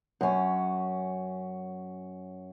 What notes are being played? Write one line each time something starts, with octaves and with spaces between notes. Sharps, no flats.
F#2 C#4